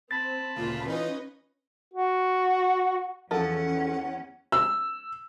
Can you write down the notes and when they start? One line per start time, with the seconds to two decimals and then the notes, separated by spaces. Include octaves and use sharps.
0.11 C4 A5 B5 A6
0.56 D2 A#2 C#3 A#3 F4
0.88 E3 C#4 D#4 F4 B4 D#5
1.94 F#4
3.31 E2 F3 C#4 A4 F#5
4.52 E6